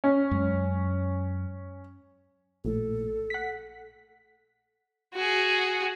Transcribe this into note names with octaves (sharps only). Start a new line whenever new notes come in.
C#4
F#2 G#3
A#1 A2 A4
F#5 B6
F#4 G#4